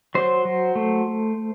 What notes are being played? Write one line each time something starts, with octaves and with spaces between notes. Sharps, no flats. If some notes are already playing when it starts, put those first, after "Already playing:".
F#3 C5
F#3
A3